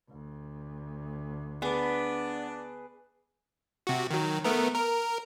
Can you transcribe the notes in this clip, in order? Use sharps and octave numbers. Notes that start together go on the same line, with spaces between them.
D2
B3 D4 G#4 B4
C3 F#4
D#3 F#3
A3 B3 A#4
A#4